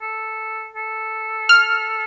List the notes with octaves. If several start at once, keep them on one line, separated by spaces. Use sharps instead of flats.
A4
A4
F6